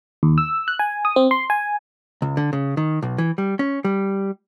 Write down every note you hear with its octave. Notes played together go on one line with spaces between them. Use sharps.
D#2
E6
F#6
G#5
D#6
C4
C6
G#5
C#2
D3
C#3
D#3
B1
E3
G3
C#4
G3